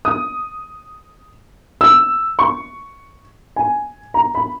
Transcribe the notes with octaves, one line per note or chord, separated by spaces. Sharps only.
D#6
E6
C#6
G#5
A#5
B5